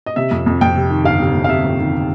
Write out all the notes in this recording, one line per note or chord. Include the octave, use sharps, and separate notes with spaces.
D#5
C3 E5
F2
F2
F2 G5
C3
D#3
G1 F5
C3
C3
F5
C3 E5
F2
D#3